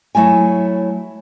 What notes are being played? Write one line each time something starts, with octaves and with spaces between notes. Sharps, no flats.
F#3 A3 E4 G#5